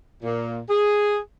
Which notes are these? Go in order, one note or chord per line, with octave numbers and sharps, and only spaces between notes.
A#2
G#4